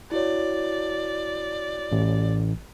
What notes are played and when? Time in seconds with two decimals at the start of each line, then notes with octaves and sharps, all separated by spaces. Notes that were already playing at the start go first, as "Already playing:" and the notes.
0.12 E4 F#4 C#5 D5
1.92 A1